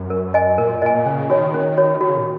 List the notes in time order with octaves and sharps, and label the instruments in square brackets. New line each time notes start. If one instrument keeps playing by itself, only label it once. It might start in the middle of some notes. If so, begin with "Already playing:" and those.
Already playing: [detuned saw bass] F#2
[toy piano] A#4
D#5 G#5
[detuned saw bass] A#2 [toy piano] A#4
[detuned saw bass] A#2 [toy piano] D#5 G#5
[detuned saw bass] A#2
[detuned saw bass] C#3 [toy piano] C#4
[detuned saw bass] D#3 [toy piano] F#4 C#5
[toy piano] C#4
F#4 C#5
[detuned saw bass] D#3 [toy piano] F#4
[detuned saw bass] C#3
A#2